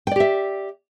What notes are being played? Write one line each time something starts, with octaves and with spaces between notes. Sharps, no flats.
G4 D5 E5 G5